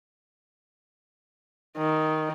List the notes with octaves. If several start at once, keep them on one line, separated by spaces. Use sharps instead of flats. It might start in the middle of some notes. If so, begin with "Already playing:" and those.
D#3